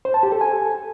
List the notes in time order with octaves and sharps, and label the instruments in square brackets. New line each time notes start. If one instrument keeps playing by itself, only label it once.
[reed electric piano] C5
A5
G4
A4
G#5